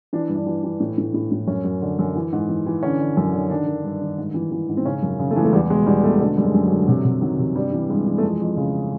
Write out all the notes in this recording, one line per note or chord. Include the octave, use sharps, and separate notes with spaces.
E3 D4
G2
D4
E3
E3
A2
A2
A2
A2
F#2 C#4
F#2
D3
F#2
E3
G#2
E3
E3
D3 C#4
D3
F#2 C#4
D3
D#3 D4
D#3
G2
D#3
G#2
E3
E3
G#2
C4
C#3 C#4
F#2
C#3
A3
E3 G#3
A3
E2 G3
B2 G#3
E2 G3
B2 A3
G#3
D3 A3
F#2 G3
G#3
F#2
F#3
D3
C3 F#3
C3
D#3 F#3
C3
G2 G3
E3
G2 G#3
E3
A3
F2 G#3
F2
C#3